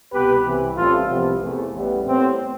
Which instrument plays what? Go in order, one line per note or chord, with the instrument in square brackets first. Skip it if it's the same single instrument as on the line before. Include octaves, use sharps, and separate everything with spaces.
[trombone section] C2 B2 B3 G4 B4
C2 C3 E3
A1 A2 G3 C4 F4 A4
C2 C3 F3 B3
E2 C3 E3 A3
A1 A2 G3 B3
A2 G3 B3 C4